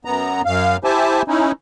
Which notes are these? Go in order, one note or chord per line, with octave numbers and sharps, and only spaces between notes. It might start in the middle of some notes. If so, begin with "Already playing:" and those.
F#2 B3 A#5
F#2 F5
E4 G4 C5 E5 G#5 A5
C#4 D#4 E4